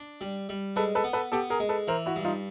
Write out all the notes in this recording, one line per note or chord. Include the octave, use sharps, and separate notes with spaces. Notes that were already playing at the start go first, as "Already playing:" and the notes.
Already playing: D4
G3
G3
G#3 A4 B4
A4 B4
B3
A4 B4
B3 G4 A4
G#4 A#4
G#3
A4 B4
E3 A#4 C5
E4 F#4
G2
D#4 F4